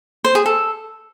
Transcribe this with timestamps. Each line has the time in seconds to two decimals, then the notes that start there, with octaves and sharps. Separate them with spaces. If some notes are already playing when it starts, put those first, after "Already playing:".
0.24 C5
0.35 G#4
0.46 A4